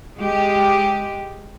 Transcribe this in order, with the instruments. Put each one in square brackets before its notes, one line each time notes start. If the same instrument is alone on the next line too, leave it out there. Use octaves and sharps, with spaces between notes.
[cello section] G#3 G4